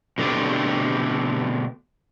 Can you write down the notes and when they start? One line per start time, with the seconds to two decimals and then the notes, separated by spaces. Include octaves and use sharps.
0.18 B2 D3 A3 C4 G4